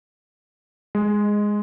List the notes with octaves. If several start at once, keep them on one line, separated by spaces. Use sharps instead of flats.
G#3